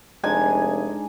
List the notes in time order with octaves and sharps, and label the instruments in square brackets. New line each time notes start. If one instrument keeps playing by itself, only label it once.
[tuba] F1 [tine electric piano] G#3 D4 D#4 [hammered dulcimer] G#5